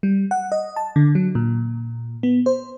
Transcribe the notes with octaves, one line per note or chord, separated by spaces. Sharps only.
G3
F#5
D#5
A5
D3
F#3
A#2
B3
C5